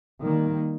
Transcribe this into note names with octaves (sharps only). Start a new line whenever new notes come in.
D#3 G3 A#3